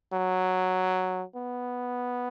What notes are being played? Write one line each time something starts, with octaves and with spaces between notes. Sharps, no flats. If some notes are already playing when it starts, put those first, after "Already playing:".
F#3
B3